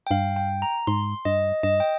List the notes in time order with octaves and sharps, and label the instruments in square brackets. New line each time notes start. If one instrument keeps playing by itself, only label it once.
[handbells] G5
[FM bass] G2 [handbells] F5
[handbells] G5
A#5
[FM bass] G#2 [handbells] C6
[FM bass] G2 [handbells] D#5
[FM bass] G2 [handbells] D#5
[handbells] G5